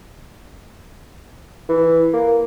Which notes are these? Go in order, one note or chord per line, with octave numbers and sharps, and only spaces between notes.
E3
A#3